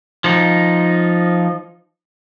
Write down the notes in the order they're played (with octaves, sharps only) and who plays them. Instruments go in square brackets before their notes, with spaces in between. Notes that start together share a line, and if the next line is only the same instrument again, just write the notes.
[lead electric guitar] F3 D#4